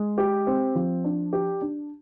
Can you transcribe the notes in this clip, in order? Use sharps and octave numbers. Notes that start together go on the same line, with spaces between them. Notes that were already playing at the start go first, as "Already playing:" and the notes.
Already playing: G#3
G4
C4
F3
D4
G4
D4